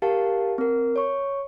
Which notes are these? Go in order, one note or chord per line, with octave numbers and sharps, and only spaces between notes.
G4 A#4 F5 F#5 A5
C4 A#4
C#5 C#6